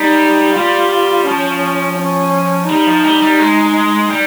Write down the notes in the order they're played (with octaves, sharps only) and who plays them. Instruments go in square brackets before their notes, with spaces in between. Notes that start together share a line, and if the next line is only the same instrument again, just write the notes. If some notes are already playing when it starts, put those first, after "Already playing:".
Already playing: [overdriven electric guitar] G3 [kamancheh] D#4
[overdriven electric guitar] G3 [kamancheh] F4
[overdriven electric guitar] F3 [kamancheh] C#4
[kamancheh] C#4
[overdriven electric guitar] G3 [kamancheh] D#4
[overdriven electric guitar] F3
G3
G3
G#3
G3